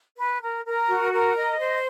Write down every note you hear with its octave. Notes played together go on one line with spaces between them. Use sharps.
B4
A#4
A#4
F#4
A#4
D#5
C5